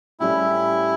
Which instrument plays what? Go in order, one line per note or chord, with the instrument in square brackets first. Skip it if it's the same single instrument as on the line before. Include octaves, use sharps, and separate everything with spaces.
[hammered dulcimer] A2 G3 C#4 G4 [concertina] E4